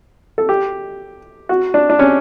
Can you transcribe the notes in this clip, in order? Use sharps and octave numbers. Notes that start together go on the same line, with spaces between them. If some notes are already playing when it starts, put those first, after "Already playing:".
A4
G4
F#4
D4
D4
C#4